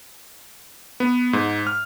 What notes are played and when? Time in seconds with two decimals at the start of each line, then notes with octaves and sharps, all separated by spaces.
1.00 B3
1.33 G#2
1.67 F6